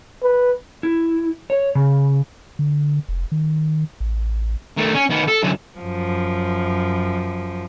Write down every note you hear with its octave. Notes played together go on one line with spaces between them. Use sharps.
B4
E4
C#5
C#3
D3
F1
D#3
A1
D#3 A3
C#4
D#3 B3
A4
F#2 D3
F#2 F3